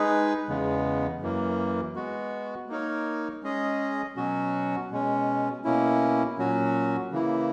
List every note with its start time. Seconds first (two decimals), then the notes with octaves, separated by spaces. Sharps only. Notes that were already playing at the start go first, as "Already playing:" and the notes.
Already playing: G#3 D#4 G#4 B4
0.48 E2 C#3 G#3 B3
1.21 F#2 E3 A#3
1.96 G#3 B3 F#4
2.69 A#3 D#4 A#4 C#5
3.43 G#3 C#4 G#4 D#5
4.17 B2 F#3 C#4 F#4
4.91 B2 G#3 C#4
5.64 B2 A#3 C#4 E4
6.38 A#2 F#3 C#4 F#4
7.11 C#3 E3 A#3 E4